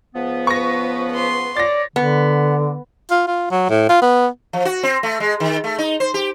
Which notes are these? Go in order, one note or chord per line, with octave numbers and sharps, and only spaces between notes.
C#2 F3 B3
B4 C#6 A#6
B4 C6
C#5 D5 A6 A#6
D3 B3
F4
F4
F#3
A2
F4
B3
F3
F#4
C4
A3
G#3
D#3
A3
D#4
C5
G4